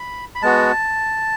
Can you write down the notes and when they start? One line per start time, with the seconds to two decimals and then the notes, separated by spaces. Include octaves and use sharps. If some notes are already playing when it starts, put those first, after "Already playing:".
Already playing: B5
0.35 B5
0.42 G#3 B3 F#4 A5